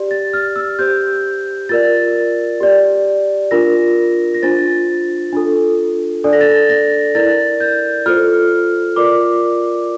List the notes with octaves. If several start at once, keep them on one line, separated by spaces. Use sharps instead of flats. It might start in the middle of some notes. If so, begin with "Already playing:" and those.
Already playing: G4 D5
A6
F6
E6
G4 C5 G6
F4 A#4 D5 A6
G4 D5
D4 F4 A#4 A#6
A#6
D4 F4 C5 A6
D4 F4 A4
D4 A4 D5
A#6
A6
A#6
A#6
E4 A#4 D5 A6
G6
F4 A4 C5 F6
F4 A#4 D5 D6